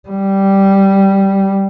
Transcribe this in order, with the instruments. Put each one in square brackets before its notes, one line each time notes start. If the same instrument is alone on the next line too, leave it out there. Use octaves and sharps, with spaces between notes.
[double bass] G3